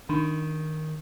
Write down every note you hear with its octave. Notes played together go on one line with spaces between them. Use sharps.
D#3 D4 D#4